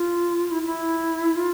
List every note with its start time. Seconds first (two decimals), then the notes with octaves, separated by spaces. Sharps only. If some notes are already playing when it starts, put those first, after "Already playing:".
Already playing: F4
0.51 E4
0.66 E4
1.36 F4